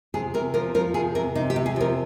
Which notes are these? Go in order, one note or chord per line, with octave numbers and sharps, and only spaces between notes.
C3 G#4
C3 A#4
F3 A#4
F3 A#4
C3 G#4
C3 A#4
C3 D#4
G4
C3
G#4
F3 A#4